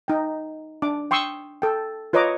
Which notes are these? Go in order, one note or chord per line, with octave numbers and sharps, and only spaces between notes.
D#4 G5
D4 D6
G5 C6 C#6 D#6 E6
A4 G5
F4 B4 C#5 D#5 A#5 D6